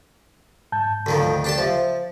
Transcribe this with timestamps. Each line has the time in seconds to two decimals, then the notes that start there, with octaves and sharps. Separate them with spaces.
0.72 G#2 A5 G6
1.06 D2 D#3 F3
1.44 D4 G4 A5
1.58 F3 C5 E5